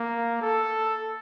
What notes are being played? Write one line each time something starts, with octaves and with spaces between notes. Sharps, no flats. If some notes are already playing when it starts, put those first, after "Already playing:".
Already playing: A#3
A4